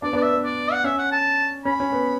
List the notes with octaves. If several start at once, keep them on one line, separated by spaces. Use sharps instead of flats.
B3 D4 D5
B3 D4
D5
E5
B3
D5
F#5
C#4 E5
F#5
A5
C#4 B5
C#4
B3